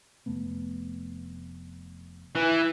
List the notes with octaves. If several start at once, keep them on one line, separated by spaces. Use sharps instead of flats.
F1 A3 B3
E3